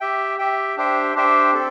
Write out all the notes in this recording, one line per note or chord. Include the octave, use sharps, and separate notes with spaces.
G4 E5 G5
G4 E5 G5
D4 G4 C5 E5 G5
D4 G4 C5 E5 G5
C4 A4